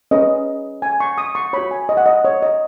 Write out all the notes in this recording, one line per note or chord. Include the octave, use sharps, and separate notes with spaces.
C#4 G#4 B4 D#5
G#5
C#6
D#6
C#6
F#4 C#5 B5
G#5
D#5
F#5
D#5
C#5
D#5